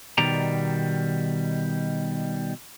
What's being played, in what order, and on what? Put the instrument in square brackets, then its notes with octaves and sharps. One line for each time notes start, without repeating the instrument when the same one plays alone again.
[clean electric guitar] B2 D#3 G3 D5 A#5